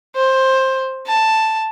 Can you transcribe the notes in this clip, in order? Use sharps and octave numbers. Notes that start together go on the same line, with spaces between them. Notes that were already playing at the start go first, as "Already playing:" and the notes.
C5
A5